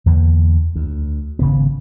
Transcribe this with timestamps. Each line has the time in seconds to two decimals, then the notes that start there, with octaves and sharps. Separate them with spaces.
0.06 E2 D3 A#3
0.76 D2
1.39 G#1 C#3 B3